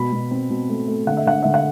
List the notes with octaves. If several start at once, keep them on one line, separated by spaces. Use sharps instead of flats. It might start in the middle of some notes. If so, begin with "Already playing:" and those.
Already playing: B2 B5
B2
C4
B2
A3
A3
D3 F#5
E5
D3 F#5
D3 E5
F#5